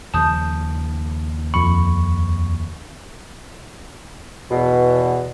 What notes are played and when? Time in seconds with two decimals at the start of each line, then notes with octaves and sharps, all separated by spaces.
0.14 D#2 C#3 F3 A5 D#6 G6
1.54 F2 B5 C#6
4.51 E2 B2